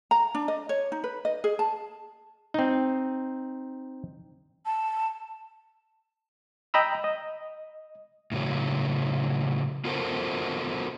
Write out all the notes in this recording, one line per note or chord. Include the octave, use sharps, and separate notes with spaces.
A#5
D4
D#5
C#5
D#4
B4
D#5
G#4
A5
C4 D#4
A5
D#5 G5 A#5 B5 E6
D#5
A2 C#3 F#3
B3 F4 F#4 A4 A#4 C5